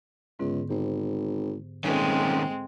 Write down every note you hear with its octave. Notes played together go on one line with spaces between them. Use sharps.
C#2 G#2 D3 B3
G#1 G4 C5
D#1 D#3 G#3 C4 C#4 A4 C#6